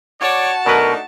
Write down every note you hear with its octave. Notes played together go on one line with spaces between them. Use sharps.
F#4 C#5 D5 A5
B2 F#3 A3 D4 D#4 A#4 B4